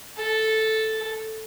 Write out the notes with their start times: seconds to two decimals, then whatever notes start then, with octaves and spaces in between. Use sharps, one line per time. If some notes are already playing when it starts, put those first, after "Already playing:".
0.17 A4